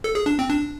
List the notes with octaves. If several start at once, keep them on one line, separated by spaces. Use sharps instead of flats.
A4
G#4
D4
C4
D4